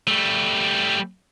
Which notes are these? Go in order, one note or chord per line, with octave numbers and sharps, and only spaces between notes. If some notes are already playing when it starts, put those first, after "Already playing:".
G3 A3